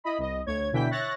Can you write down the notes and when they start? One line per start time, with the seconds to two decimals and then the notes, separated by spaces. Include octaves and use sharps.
0.04 E4 D#5 B5
0.18 C2 D#5
0.46 D2 C#5 G#6
0.72 B2 D3 E3 E4 G5 B6
0.91 C#5 E5 F#6 A6 A#6